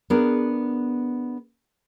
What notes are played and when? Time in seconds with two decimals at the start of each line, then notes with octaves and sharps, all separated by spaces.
0.10 B3 D4 G#4 A#4